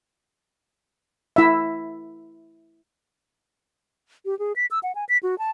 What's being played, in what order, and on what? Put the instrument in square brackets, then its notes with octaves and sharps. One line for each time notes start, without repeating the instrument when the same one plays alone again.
[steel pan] E4 E5
[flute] G4
G#4
B6
E6
F#5
G#5
B6
F#4
A5